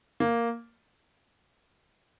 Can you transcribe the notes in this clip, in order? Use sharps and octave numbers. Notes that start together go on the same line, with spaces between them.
A#3